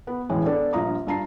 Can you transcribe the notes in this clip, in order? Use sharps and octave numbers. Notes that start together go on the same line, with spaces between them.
B3
E1 A1 G#3 E4
B3 D4 A4 D5
A#1 G2 F4 A#5 D#6
G2 F4 A5 A#5 C7